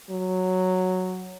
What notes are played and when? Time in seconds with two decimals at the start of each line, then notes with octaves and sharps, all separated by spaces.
0.10 F#3